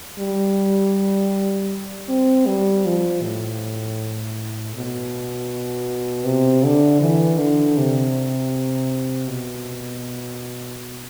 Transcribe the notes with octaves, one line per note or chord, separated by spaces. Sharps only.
G3
C4
G3
F3
A2
B2
C3
D3
E3
D3
C3
B2